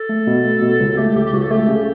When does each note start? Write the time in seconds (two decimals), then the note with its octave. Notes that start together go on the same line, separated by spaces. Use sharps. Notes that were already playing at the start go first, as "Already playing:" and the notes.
Already playing: A4
0.09 A3
0.27 B2
0.45 A3
0.62 B2
0.80 C#2
0.97 A3 G4
1.16 C#2 G4
1.26 G4
1.33 C#2 F#4
1.42 A4
1.50 A3 G4
1.68 C#3